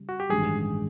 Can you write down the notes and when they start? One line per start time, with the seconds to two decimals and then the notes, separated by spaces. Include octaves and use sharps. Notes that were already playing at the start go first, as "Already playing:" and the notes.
Already playing: C#3 G3
0.09 F#4
0.20 G4
0.29 A1 G2 D#3 G#3 G#4